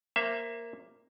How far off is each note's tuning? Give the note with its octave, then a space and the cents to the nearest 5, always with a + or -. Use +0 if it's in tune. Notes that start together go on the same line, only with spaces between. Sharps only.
A#3 +0 C5 +15 E5 +20